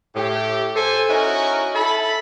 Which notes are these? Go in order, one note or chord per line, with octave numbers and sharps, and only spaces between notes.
A2 G4
A4 C5 G#5
C#4 D#4 E4 F#4 A#4 G#5
E4 A4 A5 B5